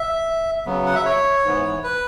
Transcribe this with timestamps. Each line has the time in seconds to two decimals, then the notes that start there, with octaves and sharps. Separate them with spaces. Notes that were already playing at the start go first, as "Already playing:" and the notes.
Already playing: E5
0.66 C#3 F#3 B3
0.86 F#5
0.95 E5
1.05 C#5
1.45 G#2 E3 B3
1.84 B4